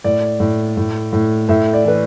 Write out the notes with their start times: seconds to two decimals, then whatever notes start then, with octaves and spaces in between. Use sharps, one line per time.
0.04 A2 D5
0.40 A2
0.77 A2
1.13 A2
1.49 A2 E5
1.73 D5
1.85 E3 B4